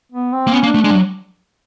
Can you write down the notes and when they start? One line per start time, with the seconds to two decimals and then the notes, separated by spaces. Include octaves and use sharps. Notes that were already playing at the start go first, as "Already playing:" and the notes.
0.12 B3
0.33 C4
0.47 A#3
0.53 B3 C#4
0.63 A#3
0.67 D4
0.74 A3
0.81 G#3 D4
0.90 G3
0.95 F#3